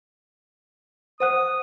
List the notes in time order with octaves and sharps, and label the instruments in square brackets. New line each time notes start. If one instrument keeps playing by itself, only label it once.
[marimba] C5 F#5 F#6 [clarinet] D#6